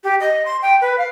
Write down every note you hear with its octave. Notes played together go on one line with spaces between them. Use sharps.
G4
D#5
C6
G5
B4
F5